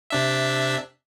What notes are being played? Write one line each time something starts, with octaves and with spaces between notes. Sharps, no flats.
C3 D4 E5